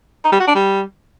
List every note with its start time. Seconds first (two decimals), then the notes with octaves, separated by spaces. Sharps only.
0.25 D#4
0.32 G3
0.40 F#4
0.47 D4
0.55 G3